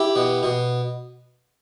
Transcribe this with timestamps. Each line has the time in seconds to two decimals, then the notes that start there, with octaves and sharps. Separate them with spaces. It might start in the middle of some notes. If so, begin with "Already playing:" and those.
Already playing: E4 G4
0.15 B2
0.43 B2